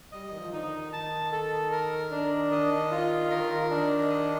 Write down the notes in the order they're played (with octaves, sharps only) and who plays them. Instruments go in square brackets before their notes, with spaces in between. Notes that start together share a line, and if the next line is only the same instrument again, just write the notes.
[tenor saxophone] G3 [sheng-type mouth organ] D#5
[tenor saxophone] D#3
F3
[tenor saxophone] D3 [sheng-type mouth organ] D#4
[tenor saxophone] D#3
[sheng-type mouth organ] A5
A4
A#4
D4
[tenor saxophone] D#3 [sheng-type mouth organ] D#5
[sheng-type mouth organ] F4
[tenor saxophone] D#3 [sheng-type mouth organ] A#4
[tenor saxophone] D#3 [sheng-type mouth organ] D4
[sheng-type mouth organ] D#5